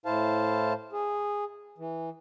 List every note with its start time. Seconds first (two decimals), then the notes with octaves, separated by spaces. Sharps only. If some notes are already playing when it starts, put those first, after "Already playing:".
0.06 A2 E4 C5 F5 A5
0.93 G#4
1.78 E3